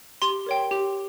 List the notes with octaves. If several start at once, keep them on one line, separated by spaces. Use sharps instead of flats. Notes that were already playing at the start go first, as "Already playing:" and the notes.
G4 C6
A#4 C#5 G5
G4